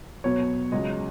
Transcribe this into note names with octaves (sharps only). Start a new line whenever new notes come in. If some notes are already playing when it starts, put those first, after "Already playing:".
B2 F#3 B3 C#5
C#2 C#3 F#3 D#5